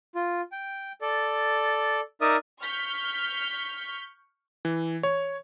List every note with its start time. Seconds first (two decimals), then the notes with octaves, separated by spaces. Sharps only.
0.15 F4
0.52 G5
1.02 A4 D5
2.21 D#4 A#4 D5 E5 D#6
2.62 C#6 F6 G6 B6
4.65 E3
5.03 C#5